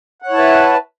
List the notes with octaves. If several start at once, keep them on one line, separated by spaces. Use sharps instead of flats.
E4 B4 C#5 F#5 A5